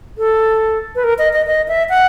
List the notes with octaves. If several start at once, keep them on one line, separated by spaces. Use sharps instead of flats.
A4
B4
A#4
D#5
D#5
D#5
E5
F#5